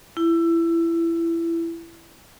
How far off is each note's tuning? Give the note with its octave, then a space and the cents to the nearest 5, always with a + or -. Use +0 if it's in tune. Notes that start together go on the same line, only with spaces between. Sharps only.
E4 +20